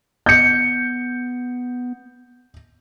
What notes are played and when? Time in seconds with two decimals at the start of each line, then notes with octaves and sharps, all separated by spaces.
0.26 B3 G6 C#7